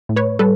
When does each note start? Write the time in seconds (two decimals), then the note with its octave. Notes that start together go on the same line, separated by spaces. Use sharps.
0.09 A2
0.16 B4 C#5
0.39 G3 A4 B4